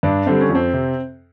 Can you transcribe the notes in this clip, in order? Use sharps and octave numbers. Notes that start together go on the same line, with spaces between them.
G2 D4
D3 G3 C4
C#4
F2
C4
C3